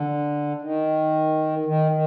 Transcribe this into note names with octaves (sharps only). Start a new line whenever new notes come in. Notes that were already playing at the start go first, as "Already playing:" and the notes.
Already playing: D3
D#3
D#3
D#3